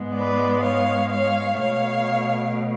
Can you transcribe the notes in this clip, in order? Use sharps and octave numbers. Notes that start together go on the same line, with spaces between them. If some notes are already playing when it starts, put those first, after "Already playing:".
Already playing: G#2 G#3 B3
B4 D5
C#5 F5
C#5 F5
B2 A3 C#5 F5